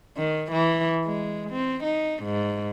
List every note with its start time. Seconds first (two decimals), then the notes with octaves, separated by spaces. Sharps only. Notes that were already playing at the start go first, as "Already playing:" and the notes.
0.17 D#3
0.52 E3
1.05 G#3
1.51 C4
1.84 D#4
2.23 G#2